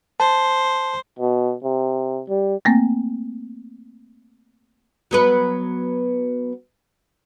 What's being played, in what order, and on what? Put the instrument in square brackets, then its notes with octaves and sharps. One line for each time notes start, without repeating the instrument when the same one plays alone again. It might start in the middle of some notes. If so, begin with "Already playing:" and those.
[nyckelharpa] C5 [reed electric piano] A5
[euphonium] B2
C3
G3
[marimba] A3 A#3 C4
[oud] F#3 B3 B4